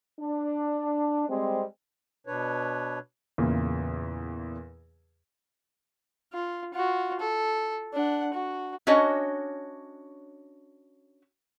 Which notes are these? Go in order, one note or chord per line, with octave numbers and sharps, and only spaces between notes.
D4
G3 G#3 C4
B2 D4 B4 C#5
E2 A#2 C#3
F4
F4 F#4
A4
D4 F#5
F#4
C#4 D4 F#4 C#5 D#5